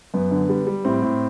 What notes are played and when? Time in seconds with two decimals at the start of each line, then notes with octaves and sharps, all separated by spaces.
0.14 F#2 B3
0.31 D3
0.49 G3
0.67 G3
0.85 A2 C4
1.02 A2